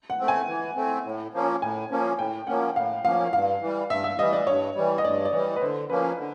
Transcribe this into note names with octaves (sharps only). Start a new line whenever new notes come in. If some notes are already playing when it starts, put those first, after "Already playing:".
F#5
A3 C4
G#5
E3
A3 C4
A2
F3 A#3 C#4
A2 G#5
F3 A#3 C#4
A2 G5
F3 A#3 C#4 F#5
A2 F5
F3 A#3 C#4 F5
G2 F5
E3 G3
G2 E5
E5
E3 G3 D#5
D5
G2 C#5
E3 G3
D#5
G2 D5
D5
E3 G3 C#5
B4
D3 C5
F3 A#3 C#4 B4
D3